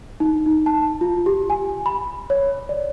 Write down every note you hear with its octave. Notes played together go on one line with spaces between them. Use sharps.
D#4
D#4
A5
F4
G4
G#5
B5
C#5
D5